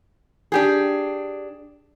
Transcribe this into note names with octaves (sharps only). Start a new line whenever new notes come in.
D4 G4 G#4